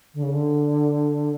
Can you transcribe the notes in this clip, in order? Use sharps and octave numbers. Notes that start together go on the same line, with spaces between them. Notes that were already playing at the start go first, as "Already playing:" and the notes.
D3
C#3
D3